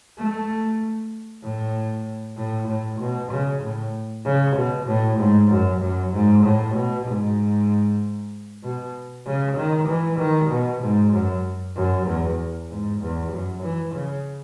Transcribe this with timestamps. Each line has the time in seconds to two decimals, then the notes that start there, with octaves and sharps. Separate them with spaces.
0.18 A3
1.44 A2
2.37 A2
2.68 A2
3.00 B2
3.32 C#3
3.63 A2
4.25 C#3
4.56 B2
4.87 A2
5.19 G#2
5.51 F#2
5.81 F#2
6.13 G#2
6.44 A2
6.75 B2
7.07 G#2
8.63 B2
9.26 C#3
9.57 D#3
9.88 E3
10.19 D#3
10.51 B2
10.82 G#2
11.13 F#2
11.76 F#2
12.07 E2
12.70 G#2
13.01 E2
13.33 F#2
13.64 E3
13.95 C#3